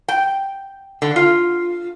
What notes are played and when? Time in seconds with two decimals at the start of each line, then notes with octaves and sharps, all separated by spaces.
0.08 G5
1.02 D3
1.16 F4